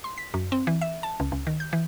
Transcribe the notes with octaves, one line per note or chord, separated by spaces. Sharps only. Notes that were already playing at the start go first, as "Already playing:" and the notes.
C6
B6
F#2
C4
E3
E5
A5
C#2
C#2
D#3
G6
E3